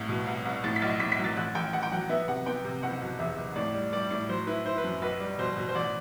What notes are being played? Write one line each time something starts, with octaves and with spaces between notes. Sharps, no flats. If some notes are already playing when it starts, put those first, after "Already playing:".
Already playing: C2 A2
B2
C2
C2
A2 A6
B6
B1 A6
A2 B6
B6
F#3
A6
A1 F#6
A1 G5
A1 F#5
G5
F#3 F#5
B3 E5
C3 F#5
B3 G5
C3
F#1 F#5
B2
E2 E5
F#1
A2 D5
G3
G3 D5
A2 D5
F#3 C5
E4 B4
E4 C5
B4
F#2
B1 B4
G3
B2 C5
B2
C5
A1 D5